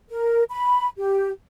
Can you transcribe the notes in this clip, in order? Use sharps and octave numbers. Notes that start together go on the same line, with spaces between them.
A#4
B5
G4